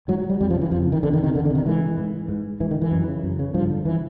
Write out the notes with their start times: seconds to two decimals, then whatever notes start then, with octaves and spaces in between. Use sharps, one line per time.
0.08 G#2 F#3
0.19 F#3
0.30 G3
0.41 F2 G3
0.50 F3
0.56 C#3
0.62 E3
0.71 F2 F3
0.87 C#3
0.92 D#3
1.03 E2 D3
1.13 D#3
1.18 C3
1.24 D#3
1.35 E2 D3
1.45 D3
1.50 C3 D#3
1.66 G#2 E3
1.97 G#2
2.28 G#2
2.60 G#2 E3
2.71 D#3
2.82 E3
2.91 F#2
3.07 C#3
3.23 F#2
3.39 C#3
3.54 G2 F3
3.70 D3
3.85 E3